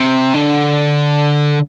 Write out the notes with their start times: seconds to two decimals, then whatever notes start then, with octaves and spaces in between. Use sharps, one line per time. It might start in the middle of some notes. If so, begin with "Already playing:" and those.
Already playing: C3
0.34 D3